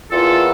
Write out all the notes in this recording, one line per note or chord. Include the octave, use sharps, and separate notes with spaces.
E2 E3 A#3 F4 A4